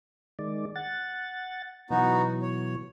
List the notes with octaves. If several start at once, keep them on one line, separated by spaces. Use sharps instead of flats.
D#3 G#3 D5
F#5 A6
B2 E3 F#3 B3 D#4 F#4
C#5